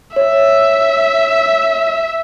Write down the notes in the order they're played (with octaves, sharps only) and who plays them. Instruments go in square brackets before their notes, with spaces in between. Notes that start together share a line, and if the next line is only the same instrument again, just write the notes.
[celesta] C#5 [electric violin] E5